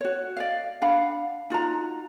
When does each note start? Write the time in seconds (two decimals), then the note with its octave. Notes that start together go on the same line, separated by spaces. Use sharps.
0.01 F#4 C#5
0.37 D5 D#5 F5
0.82 D4 F5 F#5 B5
1.50 D#4 F4 F#4 A#5